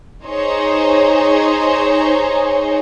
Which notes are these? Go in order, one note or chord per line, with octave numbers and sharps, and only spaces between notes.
D#4 G#4 C5 C#5